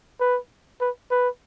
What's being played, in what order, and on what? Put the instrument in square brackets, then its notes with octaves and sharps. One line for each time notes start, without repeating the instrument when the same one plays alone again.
[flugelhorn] B4
B4
B4